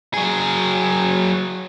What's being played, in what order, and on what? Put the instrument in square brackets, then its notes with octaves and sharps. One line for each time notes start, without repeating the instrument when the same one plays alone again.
[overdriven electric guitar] F#3 G#4